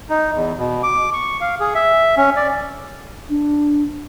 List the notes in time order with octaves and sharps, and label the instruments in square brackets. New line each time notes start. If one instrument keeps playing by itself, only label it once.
[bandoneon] D#4
E2
B2
D6
C#6
F5
G#4
E5
C#4
D5
[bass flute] D4